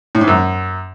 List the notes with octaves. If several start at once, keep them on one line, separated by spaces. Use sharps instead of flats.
A2
G#2
F#2